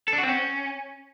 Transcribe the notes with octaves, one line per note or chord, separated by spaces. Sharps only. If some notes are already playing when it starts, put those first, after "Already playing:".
A4
D4
F#4
C4
C#4